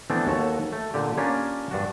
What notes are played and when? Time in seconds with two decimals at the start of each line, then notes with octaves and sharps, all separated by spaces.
0.10 E3 A3 B3 C4 D4
0.27 D#2 F#4 A4 C#5
0.72 A3
0.94 A#2 D3 G4
1.17 A#3 C#4 D4 F4 G4
1.71 G2 D4 F#4